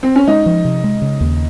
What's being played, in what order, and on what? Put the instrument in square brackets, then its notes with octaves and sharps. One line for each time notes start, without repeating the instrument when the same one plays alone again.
[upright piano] C4
C#4
[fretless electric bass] G#3 [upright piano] D#4
[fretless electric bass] F3
C3
G#3
C#3
D#2